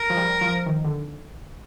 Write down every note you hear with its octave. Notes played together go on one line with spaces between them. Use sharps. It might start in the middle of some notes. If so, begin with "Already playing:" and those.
Already playing: A#4
F3
G3
F3
D#3
D3